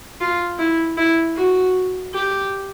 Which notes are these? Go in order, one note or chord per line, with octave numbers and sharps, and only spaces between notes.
F4
E4
E4
F#4
G4